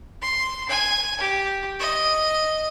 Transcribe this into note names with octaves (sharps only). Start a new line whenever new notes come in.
C6
G#5
G4
D#5